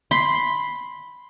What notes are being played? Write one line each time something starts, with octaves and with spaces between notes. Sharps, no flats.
B5 C6